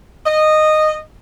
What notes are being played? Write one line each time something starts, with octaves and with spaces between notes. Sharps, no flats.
D#5